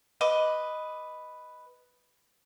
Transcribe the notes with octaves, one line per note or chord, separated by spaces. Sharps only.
B4 D#5 D6